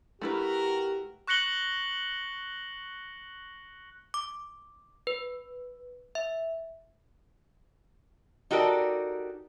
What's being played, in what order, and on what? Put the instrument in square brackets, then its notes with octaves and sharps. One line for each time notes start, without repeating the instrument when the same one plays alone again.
[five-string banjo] A3 E4 B4 [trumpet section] F#4 A#4 [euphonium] G4
[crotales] C#6 F#6 A#6 C#7 F#7 G7
[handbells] D6
B4
E5
[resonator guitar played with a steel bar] D#4 F#4 G4 A4 A#4 D5